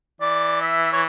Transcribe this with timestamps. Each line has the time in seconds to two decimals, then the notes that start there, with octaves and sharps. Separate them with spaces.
0.21 E3 D5
0.62 E5
0.93 C#5